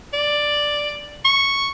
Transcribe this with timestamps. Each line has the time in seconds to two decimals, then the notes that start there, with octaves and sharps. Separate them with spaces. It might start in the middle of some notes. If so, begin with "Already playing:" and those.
0.14 D5
1.25 C#6